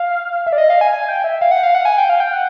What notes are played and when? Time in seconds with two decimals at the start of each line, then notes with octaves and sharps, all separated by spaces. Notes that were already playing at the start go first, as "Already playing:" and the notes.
Already playing: F5
0.47 E5
0.53 D5
0.58 D#5
0.70 F5
0.81 G#5
0.94 G#5
1.08 G5
1.24 E5
1.41 F5
1.51 F#5
1.63 F5
1.75 F#5
1.85 G#5
1.98 G5
2.10 F5
2.20 G5
2.33 F#5